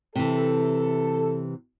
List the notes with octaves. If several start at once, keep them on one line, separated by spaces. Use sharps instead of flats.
C3 E3 A4